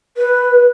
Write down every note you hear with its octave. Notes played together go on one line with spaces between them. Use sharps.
B4